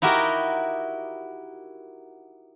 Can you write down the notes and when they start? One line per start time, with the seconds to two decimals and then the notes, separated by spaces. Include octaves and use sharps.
0.02 D#4 E4 F#4 G4 A#4